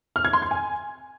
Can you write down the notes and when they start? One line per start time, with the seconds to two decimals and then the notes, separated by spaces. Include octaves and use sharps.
0.16 F6
0.25 G#6
0.33 C6
0.42 G#6
0.51 G#5